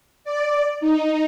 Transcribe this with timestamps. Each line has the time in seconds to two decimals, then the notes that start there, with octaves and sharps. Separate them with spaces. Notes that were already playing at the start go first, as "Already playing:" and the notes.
0.24 D5
0.81 D#4